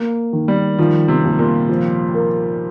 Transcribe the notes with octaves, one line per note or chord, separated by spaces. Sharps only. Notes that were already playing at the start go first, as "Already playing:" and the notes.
Already playing: A#3
D#3
G3
D#3 F3
C3
D#2
A#2
F3
A#4